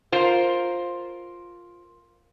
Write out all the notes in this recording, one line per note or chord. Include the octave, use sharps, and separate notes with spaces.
F4 A#4 C5